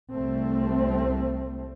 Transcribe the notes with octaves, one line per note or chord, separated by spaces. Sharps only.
C2 G3 A3 C4